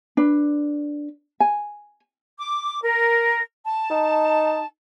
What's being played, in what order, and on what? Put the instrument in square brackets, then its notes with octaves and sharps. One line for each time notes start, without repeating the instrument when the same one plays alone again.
[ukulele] D4 B4
G#5
[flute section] D6
A#4
A5
[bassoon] D#4